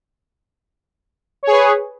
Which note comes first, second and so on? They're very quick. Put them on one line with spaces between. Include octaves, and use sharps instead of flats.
C#5 G#4 B4